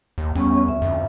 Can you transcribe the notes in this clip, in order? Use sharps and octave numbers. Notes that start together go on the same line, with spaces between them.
D#2
E2 G3 B3 C#4 C#6
D2 E5
F2